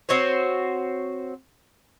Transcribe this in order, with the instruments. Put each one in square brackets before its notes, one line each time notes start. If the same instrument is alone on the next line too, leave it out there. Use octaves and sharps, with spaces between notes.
[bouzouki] C4 F#4 C5 C#5